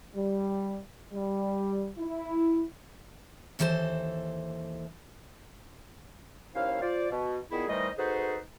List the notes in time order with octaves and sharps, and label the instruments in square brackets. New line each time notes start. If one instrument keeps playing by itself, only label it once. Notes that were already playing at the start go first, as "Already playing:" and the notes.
[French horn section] G3
G3
E4
[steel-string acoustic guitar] D#2 E3 G3 A4 C5 A5
[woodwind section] D#2 C#4 E4 C5 F5
F4 C5 D5
B2
A#2 D#3 B3 E4 G#4
D#3 E3 G3 A3 C5 D#5
D#4 F#4 G#4 A4 B4 C5